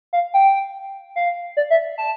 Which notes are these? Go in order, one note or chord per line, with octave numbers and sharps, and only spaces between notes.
F5
G5
F5
D5
E5
A5